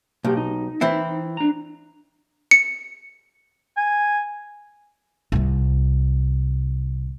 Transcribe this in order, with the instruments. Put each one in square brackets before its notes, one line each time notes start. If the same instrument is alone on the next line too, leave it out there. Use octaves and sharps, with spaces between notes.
[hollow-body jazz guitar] B1 [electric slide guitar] A#3 G4
[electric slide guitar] D#4
[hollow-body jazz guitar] E3 C4 E4
[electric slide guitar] D4 A#5
[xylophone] C#7
[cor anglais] G#5
[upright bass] C2 C3